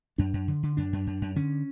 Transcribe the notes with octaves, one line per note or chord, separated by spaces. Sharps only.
F#2 D4
F#2
D3
D3
F#2 D4
F#2
F#2
F#2
D3 C#4